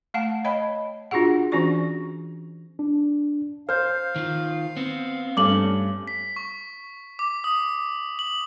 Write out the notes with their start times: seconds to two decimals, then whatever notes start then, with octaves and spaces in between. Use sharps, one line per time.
0.14 A3 F5 F#5 A5
0.45 C#5 D#5 G5 A5 B5
1.11 D4 F4 F#4 G#4 F#5
1.52 E3 C#4 D4 F#4 D5 C#6
2.79 D4
3.69 C5 F5 F6 G6
4.16 D#3 F4
4.77 B3 C4
5.37 G2 A3 C#4 D6 F#7
6.08 B6
6.36 C#6
7.19 D6
7.44 D#6
8.19 F#7